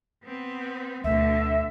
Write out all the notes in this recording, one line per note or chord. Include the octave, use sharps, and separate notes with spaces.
B3 C4
D2 B2 D3 A3 E5